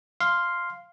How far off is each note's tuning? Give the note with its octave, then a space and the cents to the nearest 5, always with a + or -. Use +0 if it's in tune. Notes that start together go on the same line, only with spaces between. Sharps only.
F5 +0 C6 +0